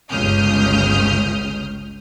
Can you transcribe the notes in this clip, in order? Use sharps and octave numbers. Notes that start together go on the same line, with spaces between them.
G1 C#2 C#3 D#6 F6 G6